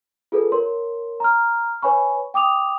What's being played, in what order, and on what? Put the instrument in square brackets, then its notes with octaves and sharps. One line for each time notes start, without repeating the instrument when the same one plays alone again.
[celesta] F4 G#4 A4 B4
A#4 C#5 C6
A#5 F6
B4 C#5 G#5 B5 C#6
G5 D6 D#6 F7